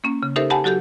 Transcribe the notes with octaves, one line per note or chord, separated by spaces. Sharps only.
A#3 C#4
C#3
D#4 G4 A4 A#4 C5 E5
G4 F#5 G#5 A5 B5
F#3 F#4 G4 A4 G6